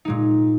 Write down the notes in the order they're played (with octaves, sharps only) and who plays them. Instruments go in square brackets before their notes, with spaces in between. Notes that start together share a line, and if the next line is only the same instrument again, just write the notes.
[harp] A#2 G#3 D#4